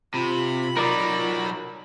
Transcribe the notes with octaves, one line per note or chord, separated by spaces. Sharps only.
C3 F4 B5
F#3 D#4 A#4 D5